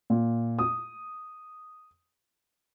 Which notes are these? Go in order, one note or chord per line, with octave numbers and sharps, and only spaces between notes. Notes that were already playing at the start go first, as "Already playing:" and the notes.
A#2
D#6